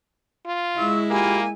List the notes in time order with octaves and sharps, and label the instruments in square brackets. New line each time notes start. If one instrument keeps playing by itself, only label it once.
[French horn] F4
[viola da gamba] G#3 E4 [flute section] C#6 [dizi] E6
[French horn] A#3 [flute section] F4 G4 B5 [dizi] G#5